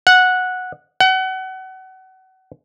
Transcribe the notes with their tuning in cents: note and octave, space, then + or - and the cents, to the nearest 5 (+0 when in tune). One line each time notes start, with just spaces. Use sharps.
F#5 -10
F#5 +30